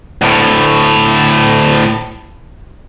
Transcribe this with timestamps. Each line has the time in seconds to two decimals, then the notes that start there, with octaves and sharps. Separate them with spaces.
0.22 D2 A2